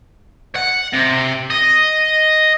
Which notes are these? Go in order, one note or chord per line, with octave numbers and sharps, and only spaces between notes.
F#5
C3
D#5